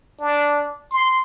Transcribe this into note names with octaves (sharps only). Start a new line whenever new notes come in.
D4
C6